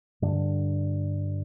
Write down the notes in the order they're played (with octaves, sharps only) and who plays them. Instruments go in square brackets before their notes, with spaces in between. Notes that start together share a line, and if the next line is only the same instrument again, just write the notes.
[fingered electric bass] G2 D3 D4